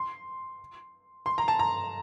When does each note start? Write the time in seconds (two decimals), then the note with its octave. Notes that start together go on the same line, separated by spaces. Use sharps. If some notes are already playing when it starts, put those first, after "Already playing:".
Already playing: C6
1.26 C6
1.38 A#5
1.48 A5
1.59 A#5